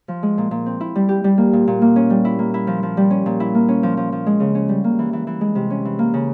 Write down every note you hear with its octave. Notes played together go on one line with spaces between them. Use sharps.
F3
G#3
A#2
A#2
C4
E4
G3
G4
G3
A#3
A#2
A#2
A#3
C#4
G3
E4
A#3
E4
F3
F3
G3
C#4
A#2
E4
A#3
C#4
F3
F3
F3
G#3
C#3
C#4
G3
A#3
E3
E3
E3
G#3
C3
C#4
E3
A#3
C#3